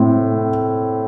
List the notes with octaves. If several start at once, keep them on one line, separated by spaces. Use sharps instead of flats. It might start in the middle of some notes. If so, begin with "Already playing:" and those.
Already playing: A2 C4